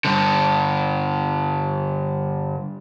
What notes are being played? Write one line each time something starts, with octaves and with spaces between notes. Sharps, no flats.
G2 D3